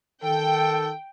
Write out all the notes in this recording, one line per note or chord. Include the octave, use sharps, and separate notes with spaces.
D#3 A4 G5